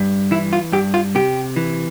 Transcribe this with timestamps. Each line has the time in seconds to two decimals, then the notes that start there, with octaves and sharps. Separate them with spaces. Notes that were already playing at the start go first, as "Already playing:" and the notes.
Already playing: G2
0.31 E3 E4
0.53 F4
0.72 G2 G4
0.94 F4
1.15 C3 G4
1.56 E3